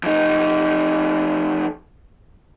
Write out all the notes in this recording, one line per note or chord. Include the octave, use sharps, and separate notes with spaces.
F2 D#4